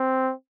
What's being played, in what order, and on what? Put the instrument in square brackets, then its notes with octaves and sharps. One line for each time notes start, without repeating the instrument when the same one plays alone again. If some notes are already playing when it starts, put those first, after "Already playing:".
Already playing: [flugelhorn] C4